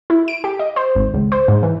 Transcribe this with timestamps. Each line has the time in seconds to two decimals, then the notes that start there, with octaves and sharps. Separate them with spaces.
0.10 E4
0.28 D7
0.44 G4
0.59 D#5
0.76 C5
0.95 G#1
1.14 C#2
1.32 C5
1.48 G#2
1.63 E3